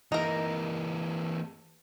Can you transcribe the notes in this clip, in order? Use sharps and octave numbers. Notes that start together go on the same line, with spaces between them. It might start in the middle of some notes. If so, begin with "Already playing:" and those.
E3 A#3 D#4 A#4